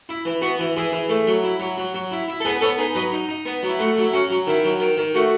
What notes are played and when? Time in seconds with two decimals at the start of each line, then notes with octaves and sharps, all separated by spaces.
0.09 E4
0.25 E3
0.42 B3 F#4
0.59 E3
0.76 E3 E4 G#4
0.92 E3
1.09 A3
1.27 F#3
1.44 E4
1.60 F#3
1.78 F#3
1.94 F#3
2.12 E4
2.28 E4
2.40 A4
2.45 B3 G#4 B4
2.55 B4
2.61 B3 A4 C#5
2.78 D#4 G#4 B4
2.95 F#3 B4 D#5
3.13 D#4
3.29 D#4
3.45 B3
3.63 F#3
3.68 E4
3.79 A3 F#4
3.97 F#3
4.02 E4
4.13 C#4 F#4
4.30 F#3
4.47 D#3 E4
4.64 F#3
4.80 D#3
4.97 D#3
5.14 A3 F#4